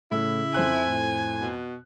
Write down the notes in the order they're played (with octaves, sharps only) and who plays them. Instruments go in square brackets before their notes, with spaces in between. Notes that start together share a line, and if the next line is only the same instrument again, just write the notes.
[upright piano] A2 [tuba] C#3 [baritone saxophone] E4
[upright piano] F2 C5 F#6 [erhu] G#5
[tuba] A2
[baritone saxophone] B2